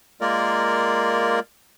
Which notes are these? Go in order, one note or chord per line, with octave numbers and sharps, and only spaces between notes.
G#3 A#3 F4 A#4 D5